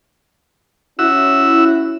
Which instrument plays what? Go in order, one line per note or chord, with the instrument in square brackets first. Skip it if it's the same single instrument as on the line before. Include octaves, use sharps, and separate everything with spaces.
[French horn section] C#4 E4 [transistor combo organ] F#4 E5 E6